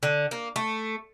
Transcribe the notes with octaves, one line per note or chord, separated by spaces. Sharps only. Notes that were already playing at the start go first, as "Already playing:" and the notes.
D3
A#3
A3